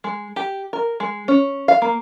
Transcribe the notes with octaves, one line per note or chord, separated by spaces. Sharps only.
G#3
G4
A#4
G#3
C#4
F5
A#3